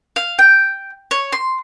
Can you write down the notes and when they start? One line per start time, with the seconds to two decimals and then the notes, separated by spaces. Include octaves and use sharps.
0.16 F5
0.39 G5
1.11 C#5
1.33 C6